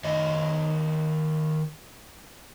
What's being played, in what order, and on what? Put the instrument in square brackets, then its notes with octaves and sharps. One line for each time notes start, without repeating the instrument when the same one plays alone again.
[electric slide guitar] D#3 C#5 D#5